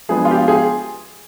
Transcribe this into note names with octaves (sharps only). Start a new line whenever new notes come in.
F3 G#3 B3 D4 G#4
F4
G4
G#4